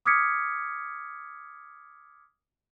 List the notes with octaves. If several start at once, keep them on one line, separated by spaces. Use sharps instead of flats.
D6 D#6 F6 G#6 B6 C#7